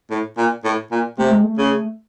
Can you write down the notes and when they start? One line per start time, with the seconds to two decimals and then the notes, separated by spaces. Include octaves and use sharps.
0.11 A2
0.37 A#2
0.64 A2
0.91 A#2
1.18 C3 A3
1.31 G#3
1.43 A3
1.58 C#3